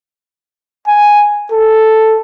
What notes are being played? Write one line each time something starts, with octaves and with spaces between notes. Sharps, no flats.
G#5
A4